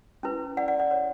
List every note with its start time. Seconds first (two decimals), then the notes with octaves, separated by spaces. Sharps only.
0.23 C#4 E4 B4
0.57 D5 F#5
0.68 D5 F#5
0.80 D5
0.91 C#5